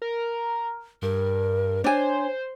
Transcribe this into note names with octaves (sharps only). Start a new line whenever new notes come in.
A#4
G2 A#4
D4 C5 C#5 G#5